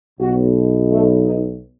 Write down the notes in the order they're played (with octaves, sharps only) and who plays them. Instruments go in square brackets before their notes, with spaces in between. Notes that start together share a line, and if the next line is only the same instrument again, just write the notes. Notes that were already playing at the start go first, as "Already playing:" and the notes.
[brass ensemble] B1 B2 F#4
A3
D#4